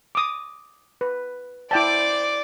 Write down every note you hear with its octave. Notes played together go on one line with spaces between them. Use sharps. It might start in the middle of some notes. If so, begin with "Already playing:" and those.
D6 D#6
B4
E4 C5 D5 G5 A5 D6